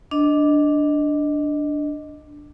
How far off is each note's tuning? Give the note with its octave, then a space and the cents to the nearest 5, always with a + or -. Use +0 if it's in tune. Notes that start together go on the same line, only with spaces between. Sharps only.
D4 +0 D#5 +0